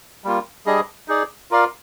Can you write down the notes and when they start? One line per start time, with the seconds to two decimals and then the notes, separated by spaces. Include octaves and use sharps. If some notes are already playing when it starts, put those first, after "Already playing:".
0.24 G3 A#3 F4
0.66 G3 D4 G#4 D#5
1.08 D#4 G#4 D5
1.51 F4 A#4 D5 F5